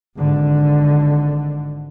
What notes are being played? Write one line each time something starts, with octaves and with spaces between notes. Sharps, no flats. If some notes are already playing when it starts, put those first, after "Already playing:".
G#1 D3